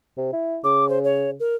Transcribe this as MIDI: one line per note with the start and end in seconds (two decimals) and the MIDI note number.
0.17 0.32 48
0.33 0.59 64
0.64 1.35 49
0.64 0.88 86
0.89 0.99 72
1.04 1.31 73
1.40 1.56 70